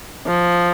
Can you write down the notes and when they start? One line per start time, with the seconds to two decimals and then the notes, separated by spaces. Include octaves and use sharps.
0.26 F3